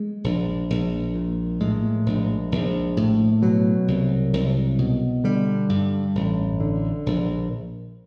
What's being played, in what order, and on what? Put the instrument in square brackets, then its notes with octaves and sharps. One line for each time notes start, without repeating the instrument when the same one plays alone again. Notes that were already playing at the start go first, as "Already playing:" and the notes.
Already playing: [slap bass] G#3
A#1
A#1
A#2
A2 G#3
A#1
A#1
A2
B2 F#3
C2
C2
B2
D3 G3
G2
A1
D3
A#1